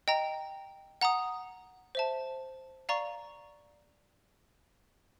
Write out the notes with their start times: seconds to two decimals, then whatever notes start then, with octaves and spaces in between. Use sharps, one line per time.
0.08 D#5 G5 A#5
1.01 F#5 A#5 D#6
1.95 C5 E5 A5
2.89 D5 F5 A#5 C#6